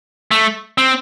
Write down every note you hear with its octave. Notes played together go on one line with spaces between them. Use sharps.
A3
C4